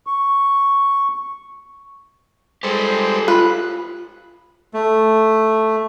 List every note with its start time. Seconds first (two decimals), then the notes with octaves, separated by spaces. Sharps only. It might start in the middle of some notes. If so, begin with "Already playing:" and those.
0.07 C#6
2.63 G3 G#3 G4 A4 C5
3.28 F4 B4
4.74 A3